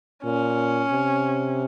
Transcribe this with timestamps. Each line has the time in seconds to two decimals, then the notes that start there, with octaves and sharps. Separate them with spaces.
0.24 A#2 C#4
0.91 C3